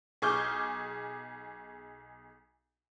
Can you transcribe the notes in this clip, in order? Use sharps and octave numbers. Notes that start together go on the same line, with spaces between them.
B1 G#4 C#6 D6 F6 G6